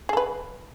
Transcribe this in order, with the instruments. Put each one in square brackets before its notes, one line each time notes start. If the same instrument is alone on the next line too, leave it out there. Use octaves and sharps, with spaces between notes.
[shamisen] G#4
A4
B4